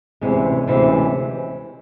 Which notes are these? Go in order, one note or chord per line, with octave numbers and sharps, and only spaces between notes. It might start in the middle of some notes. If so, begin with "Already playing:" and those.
D2 C3 E3 G#3 C#4
D2 C3 E3 G#3 C#4